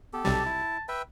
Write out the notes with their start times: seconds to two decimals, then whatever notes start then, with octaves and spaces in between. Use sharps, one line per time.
0.13 B3 G4 A4
0.25 B1 C3 G3 A5
0.46 E4
0.88 B4 E5 G5